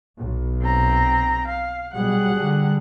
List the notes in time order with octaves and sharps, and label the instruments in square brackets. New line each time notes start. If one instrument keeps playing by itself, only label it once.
[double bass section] B1
[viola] C4 A#5
F5
[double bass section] B2 F#3 G3 [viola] G#4 F#5
[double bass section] D3 G3